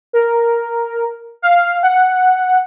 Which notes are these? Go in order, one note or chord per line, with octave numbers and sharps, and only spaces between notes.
A#4
F5
F#5